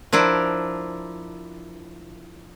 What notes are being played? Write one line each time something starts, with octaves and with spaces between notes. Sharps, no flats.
F3 D4 E4 A#4